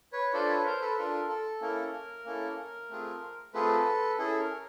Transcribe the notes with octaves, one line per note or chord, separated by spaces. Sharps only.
B4 C#5
D4 F4 A4 C5 D5
B4 C#5
A#4 C5
A4 B4
D4 F4 A4 A#4
A4
A#3 C#4 E4 A4 A#4
A#3 C#4 E4 A4
A3 C4 F4 G#4
A3 C4 F4 G#4 A4 B4
C#4 E4 G#4 A4
A#4